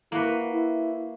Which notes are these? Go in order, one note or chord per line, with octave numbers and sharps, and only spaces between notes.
A#3 E4 F#4 B4
E4